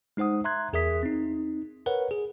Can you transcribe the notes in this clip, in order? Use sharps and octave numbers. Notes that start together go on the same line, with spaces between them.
G#3 D#4 C5 F#5 D#6
E5 A#5 C6 F#6 G#6
E2 G#4 A#4 E5 D#6 B6
C4 D#4
A#4 B4 C#5 F#5
G#4